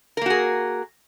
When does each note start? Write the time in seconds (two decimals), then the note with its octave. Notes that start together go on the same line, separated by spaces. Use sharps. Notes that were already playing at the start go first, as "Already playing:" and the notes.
0.17 A#4
0.22 A#3
0.26 F#4
0.30 G#4